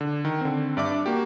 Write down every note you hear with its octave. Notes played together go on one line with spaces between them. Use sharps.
D3
D#3
D3 C4
G2 D5 E5 D6
D4
A#3 F#4 G4